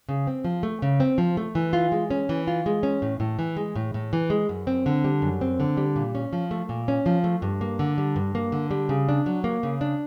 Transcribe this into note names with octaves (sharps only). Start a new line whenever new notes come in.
C#3
C4
F3
A3
C#3
C4
F3
A3
E3
F4
G#3
C#4
E3
F4
G#3
C#4
A2
A2
E3
G#3
A2
A2
E3
G#3
F#2
C4
D3
G3
F#2
C4
D3
G3
A#2
C#4
F3
A3
A#2
C#4
F3
A3
G2
A#3
D3
G3
G2
A#3
D3
G3
C#3
D4
F#3
A#3
C#3
D4